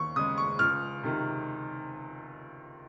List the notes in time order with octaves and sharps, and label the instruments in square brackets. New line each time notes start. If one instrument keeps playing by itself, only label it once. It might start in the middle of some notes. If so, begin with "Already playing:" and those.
Already playing: [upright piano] D#2 C#6
C#3 G#3 D#6
C#6
C#2 F6
C3 D#3